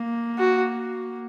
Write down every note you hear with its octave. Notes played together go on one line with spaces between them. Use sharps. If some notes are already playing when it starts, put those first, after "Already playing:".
Already playing: A#3
F#4